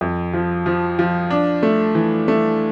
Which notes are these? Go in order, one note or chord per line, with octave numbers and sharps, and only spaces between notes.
F2
F3
F3
F3
D4
A3
E3
A3